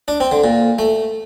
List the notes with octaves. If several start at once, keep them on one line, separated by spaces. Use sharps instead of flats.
D4
C4
D3
A#2
A3